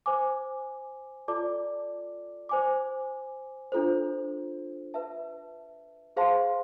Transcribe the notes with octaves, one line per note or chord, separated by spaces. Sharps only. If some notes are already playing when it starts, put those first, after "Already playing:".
C5 G#5 D6
F4 A4 D5 A5 D6
C5 G#5 D6
D4 F4 A4 C5
B4 E5 A5
G#4 C5 F5 A5 C6